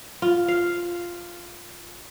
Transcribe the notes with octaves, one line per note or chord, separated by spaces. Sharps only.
F4
F5